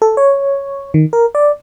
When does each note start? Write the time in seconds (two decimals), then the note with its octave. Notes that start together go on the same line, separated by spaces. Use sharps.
0.02 A4
0.17 C#5
0.94 D#3
1.13 A#4
1.35 D5